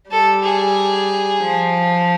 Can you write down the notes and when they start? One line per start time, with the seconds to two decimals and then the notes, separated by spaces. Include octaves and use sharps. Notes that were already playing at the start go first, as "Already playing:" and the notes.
0.11 G3 A4
0.43 G#4
1.41 F3